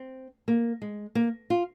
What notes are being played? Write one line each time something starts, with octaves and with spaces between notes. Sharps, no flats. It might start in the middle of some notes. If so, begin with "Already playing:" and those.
Already playing: C4
A#3
G#3
A#3
F4